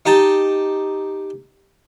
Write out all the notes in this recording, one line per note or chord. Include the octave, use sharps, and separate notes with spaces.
D#4 G4 A5